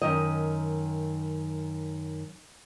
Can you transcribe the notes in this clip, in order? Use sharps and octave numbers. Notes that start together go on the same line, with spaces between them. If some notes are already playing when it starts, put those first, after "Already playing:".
F#2 D#3 D#5